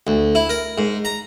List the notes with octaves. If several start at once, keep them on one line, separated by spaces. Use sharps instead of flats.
D2
E4
A#4
G#2
A#5